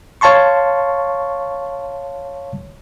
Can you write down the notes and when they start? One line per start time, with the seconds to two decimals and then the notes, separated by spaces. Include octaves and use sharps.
0.21 C#5 F5 A5 C6 C#6